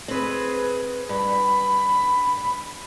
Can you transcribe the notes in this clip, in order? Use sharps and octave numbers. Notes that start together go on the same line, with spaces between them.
C4 G#4 B4
G2 B5